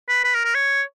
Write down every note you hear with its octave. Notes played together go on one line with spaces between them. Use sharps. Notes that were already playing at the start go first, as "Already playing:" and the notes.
B4
B4
A#4
A#4
C#5